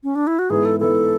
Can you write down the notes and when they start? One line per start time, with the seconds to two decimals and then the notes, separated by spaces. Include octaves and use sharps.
0.04 C#4
0.15 D4
0.27 E4
0.39 F#4
0.50 G#2 E3 B3 E4 G#4
0.65 A4
0.80 G#2 E3 B3 E4 A4